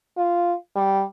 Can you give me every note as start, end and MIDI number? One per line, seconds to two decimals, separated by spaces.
0.17 0.54 65
0.76 1.03 55